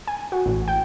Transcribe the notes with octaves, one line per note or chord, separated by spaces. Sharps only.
G#5
F#4
A1
G5